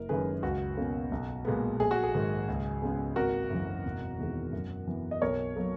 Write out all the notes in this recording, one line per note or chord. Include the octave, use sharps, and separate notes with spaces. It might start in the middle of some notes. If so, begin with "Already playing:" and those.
Already playing: F#1 A#4
F#2 D#3 G#3 C#4 G#4 B4
C#2 F#4
B2 A#3 C#4
B1
A#2 G#3 B3
A#1 G#4
F#4
G#4
G#2 D#3 G#3
C#2
C#3 G#3 B3
G#1 F#4 A#4
F#2 C#3 E3
E1
E2 D#3 G#3
F#2
E3 B3
D#5
B1 A#4 C#5
B2 F#3 A#3